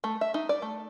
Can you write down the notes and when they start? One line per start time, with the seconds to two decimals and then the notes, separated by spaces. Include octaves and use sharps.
0.04 A3
0.21 E5
0.34 D#4
0.49 D5
0.62 A3